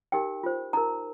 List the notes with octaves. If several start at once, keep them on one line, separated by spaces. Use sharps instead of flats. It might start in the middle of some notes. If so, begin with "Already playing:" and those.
D#4 G4 A#4 G5
F4 C5
D#4 A#4 A#5